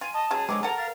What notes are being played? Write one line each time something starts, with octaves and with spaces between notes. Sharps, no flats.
F4 G#5
D#5 A5
C#3 F#3 G#3 G#4
D3 F#3 G#3 C5 D6
A4 A#4 F#5 A#5
F5 A6